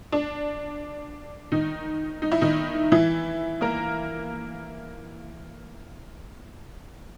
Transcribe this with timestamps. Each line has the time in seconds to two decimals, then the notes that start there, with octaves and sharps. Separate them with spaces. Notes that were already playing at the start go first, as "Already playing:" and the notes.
0.12 D4
1.52 D#3 D#4
2.22 D#4
2.32 E4
2.41 D#3 D#4
2.92 E3 E4
3.61 A#3 A#4